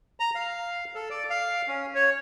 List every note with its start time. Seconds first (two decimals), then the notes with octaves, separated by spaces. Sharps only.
0.20 A#5
0.35 F5
0.95 A4
1.10 D5
1.30 F5
1.68 C#4
1.95 C#5